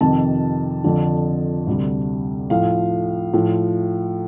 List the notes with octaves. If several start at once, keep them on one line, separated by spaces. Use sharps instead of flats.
F2 C3 D#3 A5
F2 D3 F3
D2 C3 G3
A2 F3 F5
A2 F3